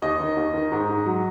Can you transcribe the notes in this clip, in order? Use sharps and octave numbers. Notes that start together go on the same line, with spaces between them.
D#2 D#5
D#3
D#2
D#3
G#2
G#2
F#3